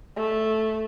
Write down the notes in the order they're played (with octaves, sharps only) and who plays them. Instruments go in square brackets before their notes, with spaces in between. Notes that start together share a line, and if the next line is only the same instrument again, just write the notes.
[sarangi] A3